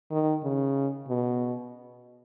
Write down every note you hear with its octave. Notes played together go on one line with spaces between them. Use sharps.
D#3
C#3
B2